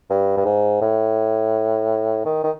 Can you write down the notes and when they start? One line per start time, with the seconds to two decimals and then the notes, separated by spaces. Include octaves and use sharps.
0.10 G2
0.37 G2
0.45 G#2
0.81 A2
2.25 D#3
2.44 D#3